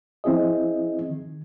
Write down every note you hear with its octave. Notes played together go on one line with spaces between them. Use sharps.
F3 C4 E4 G#4 D#5
D#3